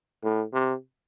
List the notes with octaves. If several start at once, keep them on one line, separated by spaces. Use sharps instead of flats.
A2
C3